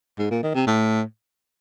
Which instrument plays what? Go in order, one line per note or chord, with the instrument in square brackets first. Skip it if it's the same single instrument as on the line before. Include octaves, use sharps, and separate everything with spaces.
[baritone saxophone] G#2
A#2
D#3
C3
A2